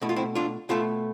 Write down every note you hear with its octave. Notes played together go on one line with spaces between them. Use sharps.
B2 A3 E4
F4
C4 E4
D4 F4
B2 A3 F4 A4